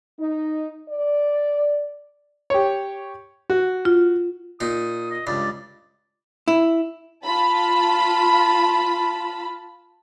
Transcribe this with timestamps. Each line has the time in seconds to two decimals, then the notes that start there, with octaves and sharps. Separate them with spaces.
0.19 D#4
0.88 D5
2.50 G4 C#5
3.50 F#4
3.85 F4
4.60 A#2 D#4 D#6
5.11 D#5
5.27 C#2 G2 D5
6.48 E4
7.25 F4 A5 B5